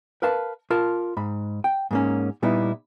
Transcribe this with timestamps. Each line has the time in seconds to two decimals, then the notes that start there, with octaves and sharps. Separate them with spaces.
0.22 A#4 B4 F5 A5
0.70 F4 A#4 A5
1.17 G#2 B5
1.64 G5
1.91 G#2 A#3 C#4
2.42 A#2 G3 B3 D#4 E4